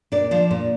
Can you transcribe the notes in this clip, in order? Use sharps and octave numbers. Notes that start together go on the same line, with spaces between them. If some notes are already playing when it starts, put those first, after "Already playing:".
A#2 D4 D5
F3 D4 D5
A#2